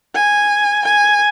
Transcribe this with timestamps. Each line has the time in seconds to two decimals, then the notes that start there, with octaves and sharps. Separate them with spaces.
0.15 G#5
0.85 G#5